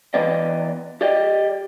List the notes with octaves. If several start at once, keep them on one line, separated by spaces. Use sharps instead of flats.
E3 B3 B4 D5 D#5
G4 D5 D#5